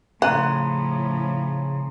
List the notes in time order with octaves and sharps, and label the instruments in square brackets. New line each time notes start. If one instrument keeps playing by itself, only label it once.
[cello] A2 F3 [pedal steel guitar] C#3 [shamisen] F#5 [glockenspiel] A#5 C6 D#7